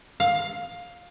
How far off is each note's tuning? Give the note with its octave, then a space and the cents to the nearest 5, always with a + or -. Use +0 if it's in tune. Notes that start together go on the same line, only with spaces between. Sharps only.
F5 +15